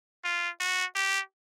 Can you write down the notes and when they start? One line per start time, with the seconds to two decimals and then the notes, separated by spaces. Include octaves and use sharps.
0.24 F4
0.60 F#4
0.95 G4